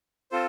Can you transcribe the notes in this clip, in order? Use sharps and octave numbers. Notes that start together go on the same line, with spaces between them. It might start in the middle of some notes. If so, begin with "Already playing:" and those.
C4 F4 A4 C5